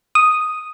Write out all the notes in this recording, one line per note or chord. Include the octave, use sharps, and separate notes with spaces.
D#6